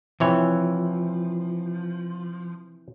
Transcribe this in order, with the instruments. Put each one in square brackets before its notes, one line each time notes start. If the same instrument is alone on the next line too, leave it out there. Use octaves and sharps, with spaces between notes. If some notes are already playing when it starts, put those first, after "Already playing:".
[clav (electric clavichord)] C3 E3 C#5 [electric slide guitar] F3